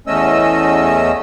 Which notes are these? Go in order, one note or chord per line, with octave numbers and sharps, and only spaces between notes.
E2 A3 C#4 D#5 E6